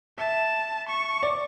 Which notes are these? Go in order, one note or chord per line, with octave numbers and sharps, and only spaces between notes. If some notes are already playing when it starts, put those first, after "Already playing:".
E5 A5
C#6
D5